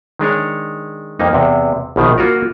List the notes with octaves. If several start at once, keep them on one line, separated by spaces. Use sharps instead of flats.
D#3 G#3 D4 C#5
F2 A#3 D#4
E2 C3
A#1 B2 D#3
A#3 F4 F#4 A#4